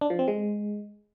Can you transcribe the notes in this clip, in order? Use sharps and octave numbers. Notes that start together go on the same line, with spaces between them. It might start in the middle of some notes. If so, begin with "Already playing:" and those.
D4
F3
C4
G#3